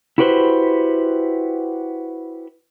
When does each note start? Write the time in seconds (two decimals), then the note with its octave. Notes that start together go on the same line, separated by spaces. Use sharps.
0.18 E4 F#4 G4 B4 C5